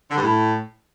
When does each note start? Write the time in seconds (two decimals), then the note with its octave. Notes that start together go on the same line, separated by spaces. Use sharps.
0.11 D3
0.16 G2
0.22 A2